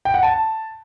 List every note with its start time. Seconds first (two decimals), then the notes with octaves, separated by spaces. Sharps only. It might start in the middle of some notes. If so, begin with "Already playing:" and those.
0.05 G5
0.14 F#5
0.23 A5